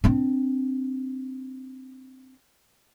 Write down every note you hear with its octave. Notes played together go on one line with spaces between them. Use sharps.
C4 D4